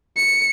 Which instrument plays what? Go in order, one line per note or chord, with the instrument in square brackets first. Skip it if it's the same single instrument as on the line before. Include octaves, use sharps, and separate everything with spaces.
[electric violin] C#7